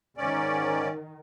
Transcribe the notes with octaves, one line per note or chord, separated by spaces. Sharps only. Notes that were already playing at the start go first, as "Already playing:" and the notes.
G#2 D#3 C#4 D5